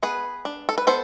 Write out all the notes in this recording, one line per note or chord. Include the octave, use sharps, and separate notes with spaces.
B3 G#4 B4
D4
A4
B4
B3 A4 C5